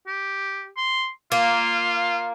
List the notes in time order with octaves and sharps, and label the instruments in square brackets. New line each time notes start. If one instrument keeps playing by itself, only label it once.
[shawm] G4
C6
[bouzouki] A#3 [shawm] F4